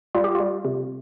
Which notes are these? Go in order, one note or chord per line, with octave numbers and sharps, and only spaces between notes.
G3 F4
G4
F4
G3
C3